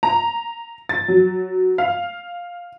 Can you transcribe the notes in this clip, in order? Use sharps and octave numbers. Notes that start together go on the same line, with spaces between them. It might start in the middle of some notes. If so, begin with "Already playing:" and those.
A#5
A6
F#3
F5